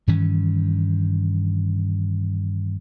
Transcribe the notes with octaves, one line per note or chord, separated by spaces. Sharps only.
G2 D#3 E3 C#4